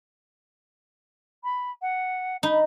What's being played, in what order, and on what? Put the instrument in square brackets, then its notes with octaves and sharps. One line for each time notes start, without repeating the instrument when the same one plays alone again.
[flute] B5
F#5
[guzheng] D#4 [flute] B5